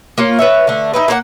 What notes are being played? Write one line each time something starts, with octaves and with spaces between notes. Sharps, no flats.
A#3 F4 C#5
B4 C#5 E5
D3 A3
D#4 E4 B4
A#3 D4 F#5